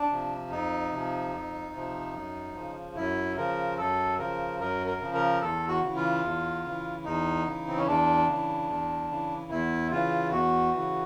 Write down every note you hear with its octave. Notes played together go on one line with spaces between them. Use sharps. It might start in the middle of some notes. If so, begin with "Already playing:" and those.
Already playing: D4
C3 F3
F2 D#4
C3 F3
F2
C3 F3
F#2
C#3 F3
F#2 E4
C#3 F3 A#4
F#2 A4
C#3 F3 A#4
F#2 A#4
A#4
C#3 F3
A#4
E2 A4
F#4
C#3 E3
F4
E2
C#3 E3
E2 D#4
C#3 E3
C4
C#4
E2 D4
C#3 E3
E2
C#3 E3
E2 E4
C#3 E3 F4
E2 F#4
C#3 E3